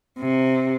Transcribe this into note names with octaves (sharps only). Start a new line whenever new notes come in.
C3